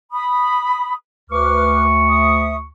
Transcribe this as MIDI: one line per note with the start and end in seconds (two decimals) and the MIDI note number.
0.12 0.93 83
0.12 0.93 87
1.31 2.71 38
1.31 1.84 71
1.31 2.71 85
1.31 1.84 86
1.31 1.84 89
2.08 2.55 76
2.08 2.55 87